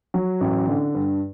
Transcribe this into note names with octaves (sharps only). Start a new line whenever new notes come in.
F#3
A1
D3
G2